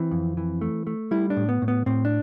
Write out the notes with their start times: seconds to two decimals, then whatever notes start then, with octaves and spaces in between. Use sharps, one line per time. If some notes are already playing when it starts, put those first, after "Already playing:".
Already playing: E3 C4
0.11 F2
0.37 E3
0.61 A3
0.87 A3
1.11 G3 E4
1.30 D4
1.37 A2
1.49 B3
1.62 A2
1.68 B3
1.86 A2 C4
2.05 D4